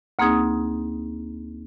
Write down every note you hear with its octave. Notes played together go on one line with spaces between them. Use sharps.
D2 A#3 C4 D#4 G#4 D#6